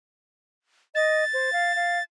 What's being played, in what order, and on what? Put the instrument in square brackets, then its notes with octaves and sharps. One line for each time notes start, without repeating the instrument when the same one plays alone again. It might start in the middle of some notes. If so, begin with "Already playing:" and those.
[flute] D#5 [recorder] A6
[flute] C5
F5
F5